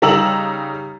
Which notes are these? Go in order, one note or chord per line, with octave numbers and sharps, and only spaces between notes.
C#3 G3 D#4 A#5 E6 F#7